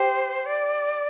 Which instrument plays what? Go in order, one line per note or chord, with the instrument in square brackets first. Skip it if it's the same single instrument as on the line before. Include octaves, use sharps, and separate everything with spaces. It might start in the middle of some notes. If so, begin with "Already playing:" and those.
Already playing: [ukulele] G4 [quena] C5
[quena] D5